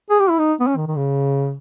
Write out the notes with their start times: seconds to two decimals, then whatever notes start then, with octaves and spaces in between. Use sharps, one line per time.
0.10 G#4
0.19 G4
0.30 E4
0.38 D#4
0.60 B3
0.67 C#4
0.77 D#3
0.87 D#3
0.96 C#3